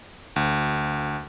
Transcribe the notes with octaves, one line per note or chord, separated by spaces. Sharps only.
D2